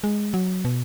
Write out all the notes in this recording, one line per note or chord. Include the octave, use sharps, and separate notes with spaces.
G#3
F#3
B2